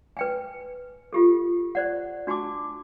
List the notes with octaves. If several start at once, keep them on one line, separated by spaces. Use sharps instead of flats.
B4 G5 G#5
F4 G4 A4
C5 D5 F#5
D4 F#4 G#5 A5 D6